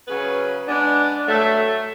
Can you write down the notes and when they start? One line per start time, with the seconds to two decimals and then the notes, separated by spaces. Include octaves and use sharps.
0.07 C#3 F#3 C#4 G#4 B4
0.68 G#3 B3 D4
1.26 A2 F#3 A3